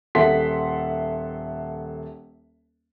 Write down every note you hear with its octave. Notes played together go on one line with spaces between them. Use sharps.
D#1 A4 E5 F#5 C6 B6